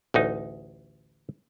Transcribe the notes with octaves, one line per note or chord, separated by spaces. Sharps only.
A1 D2 D#4